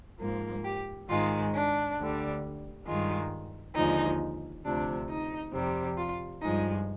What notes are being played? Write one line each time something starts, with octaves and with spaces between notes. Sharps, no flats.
G#2 F3 A#3
G4
G#2 D#3 G#3 F4
D4
D2 D3 G3
G2 D#3 G#3 F4
D#2 D3 F3 G#3 D#4
D2 C3 F3 D4
D#4
F2 C3 G3
F4
G2 F3 G#3 D#4